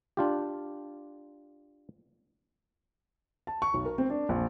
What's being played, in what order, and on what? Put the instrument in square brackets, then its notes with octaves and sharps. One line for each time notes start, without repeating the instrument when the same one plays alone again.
[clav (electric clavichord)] D4 F4 G4
[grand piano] A5
C#6
B1
A#4
C4
D4
A#1